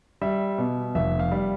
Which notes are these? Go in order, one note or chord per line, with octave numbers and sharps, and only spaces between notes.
G3 E5
B2
F1 E5
F5
G3